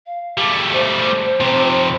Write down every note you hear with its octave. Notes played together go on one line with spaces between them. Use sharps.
F5
G3 A3
C5
F2 C3